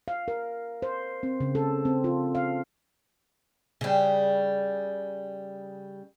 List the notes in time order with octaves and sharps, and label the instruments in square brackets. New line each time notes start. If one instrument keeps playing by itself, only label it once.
[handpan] F5
A#4
C5
C4
C#3
A4
C4
F4
F5
[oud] C#3 G3